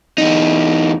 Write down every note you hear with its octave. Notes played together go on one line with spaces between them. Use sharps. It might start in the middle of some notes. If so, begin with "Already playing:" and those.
E2 D#4